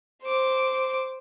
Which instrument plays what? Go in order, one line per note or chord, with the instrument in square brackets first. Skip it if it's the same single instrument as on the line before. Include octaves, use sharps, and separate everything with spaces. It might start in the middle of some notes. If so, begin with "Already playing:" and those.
[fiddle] C5 D6